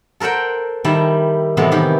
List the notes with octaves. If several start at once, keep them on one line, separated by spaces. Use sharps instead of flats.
A4 A#4 C5 F#5 G5
D#3 G3 E4 A5
A2 C3 E3 G3 G#3 B3
D#3 E3 G4